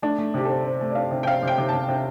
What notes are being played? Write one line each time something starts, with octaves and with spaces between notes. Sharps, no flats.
A3 D4
A3
C3 G4
C4 A4
C4
A3
D5
C4 F5
C3
G5
C4 F5
C3 G5
C3
A5
C3
C3